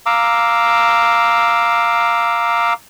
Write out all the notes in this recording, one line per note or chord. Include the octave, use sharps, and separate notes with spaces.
F5 A#5 D6 E6